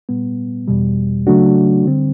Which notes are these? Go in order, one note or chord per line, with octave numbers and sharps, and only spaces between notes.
A#2 G3 B3
E2 B2 G3
C#3 F#3 A3 D4 F#4
D3 G3 C4